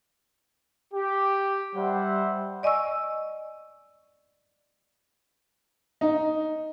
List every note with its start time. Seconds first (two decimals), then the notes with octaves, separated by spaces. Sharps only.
0.92 G4
1.75 G3 C5 E5 F#5
2.63 D5 D#5 G#5 C#6 E6
6.01 D#4